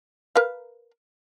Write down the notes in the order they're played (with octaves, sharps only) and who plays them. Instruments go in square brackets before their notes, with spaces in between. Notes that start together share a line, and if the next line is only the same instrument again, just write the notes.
[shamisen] A#4 B4 F5